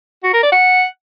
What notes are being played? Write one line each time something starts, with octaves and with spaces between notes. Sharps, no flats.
F#4
A#4
D5
F#5